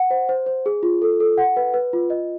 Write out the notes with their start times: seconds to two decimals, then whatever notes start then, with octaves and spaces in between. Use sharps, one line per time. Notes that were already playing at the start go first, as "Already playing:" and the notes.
Already playing: F#5
0.11 C5
0.29 C5
0.46 C5
0.66 G#4
0.83 F4
1.02 A4
1.20 A4
1.38 F#5
1.57 B4
1.74 B4
1.93 F4
2.10 D#5